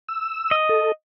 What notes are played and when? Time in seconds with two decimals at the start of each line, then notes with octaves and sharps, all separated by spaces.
0.08 E6
0.51 D#5
0.69 A4